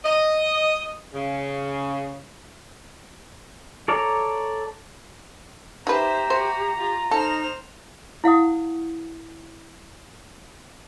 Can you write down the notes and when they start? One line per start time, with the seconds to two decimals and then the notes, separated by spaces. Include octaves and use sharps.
0.05 D#5
1.13 C#3
3.88 A4 C#5 D5 A#5
5.87 D#4 G4 B4 C5 E5 A#5
6.30 F#4 C5
6.79 F4
7.11 D#4 A4 C5 F6
8.24 E4 F5 F#5 D#6